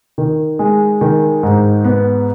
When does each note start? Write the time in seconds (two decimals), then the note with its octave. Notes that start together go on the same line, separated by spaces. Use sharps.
0.18 D#3
0.59 G#3
1.01 D#3
1.43 G#2
1.85 B3